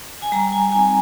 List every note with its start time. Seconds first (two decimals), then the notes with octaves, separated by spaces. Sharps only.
0.22 G#5
0.32 G3 A#5
0.52 G#5
0.72 C4 D#4 G#5